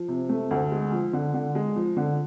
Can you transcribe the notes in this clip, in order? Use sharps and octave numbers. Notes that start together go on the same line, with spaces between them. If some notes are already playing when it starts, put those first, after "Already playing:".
Already playing: F3
C3
A3
D2
G#3
F3
D3
D3
G#3
F3
D3